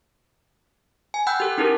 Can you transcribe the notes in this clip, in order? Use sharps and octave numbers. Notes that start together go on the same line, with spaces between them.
G#5
F#5 G5 B5 E6 F#6 G6
G4 A4 F#6
C#4 D#4 E4 G4 A4 A#4